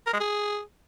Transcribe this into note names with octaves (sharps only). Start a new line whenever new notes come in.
A#4
G#3
G#4